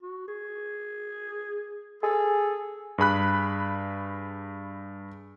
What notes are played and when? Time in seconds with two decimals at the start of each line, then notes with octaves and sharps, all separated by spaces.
0.02 F#4
0.28 G#4
2.03 G#4 A4
2.98 G2 G#4 B5 F#6